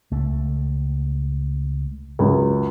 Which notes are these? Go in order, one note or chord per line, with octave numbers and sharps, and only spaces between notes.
C#2 A3
C#2 F#2